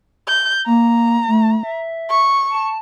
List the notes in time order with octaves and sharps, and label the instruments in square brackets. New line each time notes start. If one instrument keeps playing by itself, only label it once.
[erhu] G6
[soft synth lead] A#3 [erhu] A#5
[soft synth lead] A3
E5
[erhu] C#6
[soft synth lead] A5